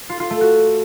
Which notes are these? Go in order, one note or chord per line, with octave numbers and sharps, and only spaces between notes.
F4
F4
A3
F#4